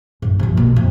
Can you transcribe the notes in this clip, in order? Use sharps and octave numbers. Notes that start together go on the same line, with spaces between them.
G2
C3 F3
B2 A#3
F2